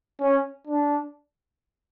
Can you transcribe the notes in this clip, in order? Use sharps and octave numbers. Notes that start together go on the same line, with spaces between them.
C#4
D4